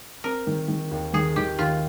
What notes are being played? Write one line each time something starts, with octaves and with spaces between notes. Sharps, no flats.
C4 A#4
D#3
D#3
D#2
D#3 G#4
D#3 G4
D#2 F4